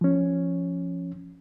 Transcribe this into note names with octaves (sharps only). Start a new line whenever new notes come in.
F3 C#4